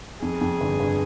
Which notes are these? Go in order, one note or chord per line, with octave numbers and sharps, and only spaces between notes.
F2 G#4
F2
G1
G1